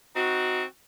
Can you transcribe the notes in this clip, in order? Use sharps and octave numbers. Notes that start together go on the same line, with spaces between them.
C4 D#4 F#4